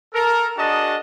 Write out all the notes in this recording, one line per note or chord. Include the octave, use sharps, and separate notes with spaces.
A4 A#4
D4 F#4 G#4 D#5 A5